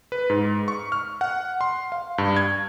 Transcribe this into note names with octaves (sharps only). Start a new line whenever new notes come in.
B4
G#2
C#6
F6
F#5
C6
F5
G2
G#6